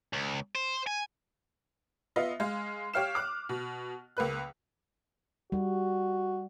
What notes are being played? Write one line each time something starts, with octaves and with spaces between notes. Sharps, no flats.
C#2
C5
G#5
B3 F4 D#5 E5
G#3 F5
G4 C#5 F5 F6 C7 E7
D6 F6 F#6
B2
C#2 A#3 B4 F#6
G3 F#4